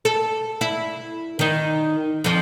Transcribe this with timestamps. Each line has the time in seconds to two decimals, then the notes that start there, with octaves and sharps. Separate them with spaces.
0.05 A4
0.61 E4
1.39 D#3 D#4
2.24 F2 F3